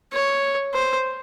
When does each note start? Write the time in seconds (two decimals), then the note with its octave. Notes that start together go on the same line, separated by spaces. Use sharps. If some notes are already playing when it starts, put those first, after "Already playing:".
0.13 C#5
0.74 C5